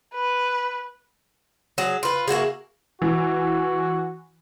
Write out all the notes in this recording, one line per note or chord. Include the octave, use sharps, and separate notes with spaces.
B4
F#3 G#4
F4 B4
A#3 E4 F#4 G#4
E3 F#4